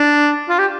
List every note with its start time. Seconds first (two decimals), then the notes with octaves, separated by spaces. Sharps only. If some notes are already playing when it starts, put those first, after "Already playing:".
Already playing: D4
0.49 F4
0.59 G4